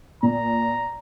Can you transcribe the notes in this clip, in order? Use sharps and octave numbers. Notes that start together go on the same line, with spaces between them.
A#2 A#5